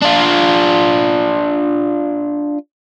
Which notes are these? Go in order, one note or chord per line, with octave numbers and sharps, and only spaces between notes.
D4 F4